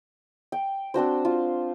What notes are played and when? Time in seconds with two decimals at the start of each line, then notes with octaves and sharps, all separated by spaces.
0.52 G5
0.94 C4 D4 F#4 C5
1.25 F4